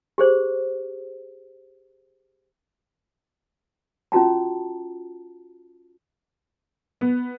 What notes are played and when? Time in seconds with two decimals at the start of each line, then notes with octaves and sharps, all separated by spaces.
0.18 G4 G#4 C5
4.12 C#4 F4 F#4 A5 A#5
7.01 B3